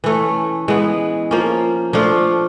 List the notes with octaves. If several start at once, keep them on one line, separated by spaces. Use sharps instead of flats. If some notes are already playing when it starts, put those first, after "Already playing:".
E3 A3 C#4
E3 G#3 B3
F3 A#3 C#4
F3 A3 D4 F4